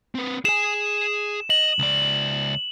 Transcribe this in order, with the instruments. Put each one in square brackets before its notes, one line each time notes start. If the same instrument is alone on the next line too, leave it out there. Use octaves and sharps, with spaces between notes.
[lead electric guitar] C4 B4
[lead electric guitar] G#4 G#5 [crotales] E7
[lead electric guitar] D#5 [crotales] F#7
[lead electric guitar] C#2 D5